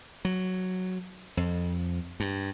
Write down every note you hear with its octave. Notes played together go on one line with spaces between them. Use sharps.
F#3
F2
G2